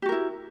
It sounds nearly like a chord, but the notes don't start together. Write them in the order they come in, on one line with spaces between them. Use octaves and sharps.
G4 F#4 A#4 E4